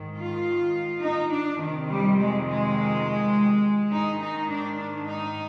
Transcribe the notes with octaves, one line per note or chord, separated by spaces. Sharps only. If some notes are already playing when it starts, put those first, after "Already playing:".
Already playing: G#2 D#3
F4
D#4
D4
F2 C3 D#3
G3
G#3
G#3
G#2 D#3 D#4
D#4
D4
D4
D#4